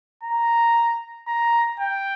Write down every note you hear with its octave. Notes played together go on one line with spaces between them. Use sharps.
A#5
A#5
G5